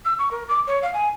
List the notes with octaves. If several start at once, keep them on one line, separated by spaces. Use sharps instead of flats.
E6
C#6
A#4
D6
C#5
F5
G#5